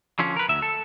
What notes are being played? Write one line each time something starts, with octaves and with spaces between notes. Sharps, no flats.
D3 F3 C#4
A#4 B4
D2 E5
A4